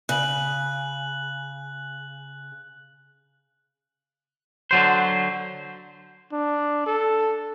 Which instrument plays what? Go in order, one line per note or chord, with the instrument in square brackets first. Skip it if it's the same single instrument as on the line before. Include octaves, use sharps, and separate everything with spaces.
[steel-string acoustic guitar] C#3 [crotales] F#6 F#7
[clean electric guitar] D3 F#3 C5
[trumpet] D4
A4